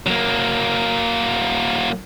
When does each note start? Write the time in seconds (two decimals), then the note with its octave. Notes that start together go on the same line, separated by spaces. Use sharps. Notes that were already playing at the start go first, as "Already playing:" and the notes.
0.07 F#3 A#3